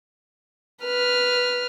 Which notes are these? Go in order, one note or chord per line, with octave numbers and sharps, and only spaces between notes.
B4 F6